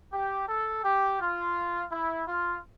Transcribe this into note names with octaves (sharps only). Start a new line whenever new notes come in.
G4
A4
G4
F4
E4
F4